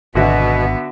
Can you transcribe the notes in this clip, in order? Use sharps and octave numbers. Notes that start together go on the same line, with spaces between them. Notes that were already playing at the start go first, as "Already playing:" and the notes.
G#1 B2 D3 B3 F#4 E5